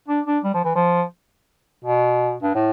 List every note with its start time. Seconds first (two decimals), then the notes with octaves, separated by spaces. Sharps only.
0.08 D4
0.27 D4
0.44 G3
0.54 F3
0.65 E3
0.75 F3
1.84 B2
2.42 G2
2.55 A2